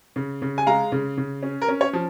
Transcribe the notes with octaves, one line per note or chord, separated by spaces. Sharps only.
C#3
C#3
G#5
G#3 F5 A#5
C#3
C#3
C#4
A#4
C#4
C#5
F3